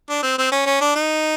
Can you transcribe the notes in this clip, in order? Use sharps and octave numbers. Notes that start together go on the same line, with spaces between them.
D4
C4
C4
C#4
C#4
D4
D#4